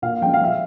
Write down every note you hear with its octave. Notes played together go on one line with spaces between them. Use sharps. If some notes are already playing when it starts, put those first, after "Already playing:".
A#2 F5
F3 G#3 C#4 G5
F5
F3 E5